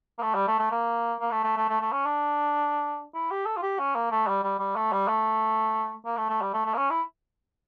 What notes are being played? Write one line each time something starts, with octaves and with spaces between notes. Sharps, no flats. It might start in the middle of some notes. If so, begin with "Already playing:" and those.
A#3
A3
G3
A3
A3
A#3
A#3
A3
A3
A3
A3
A3
C#4
D4
E4
G4
A4
F4
G4
C#4
A#3
A3
G3
G3
G3
A3
G3
A3
A#3
A3
A3
G3
A3
A3
A#3
C#4
E4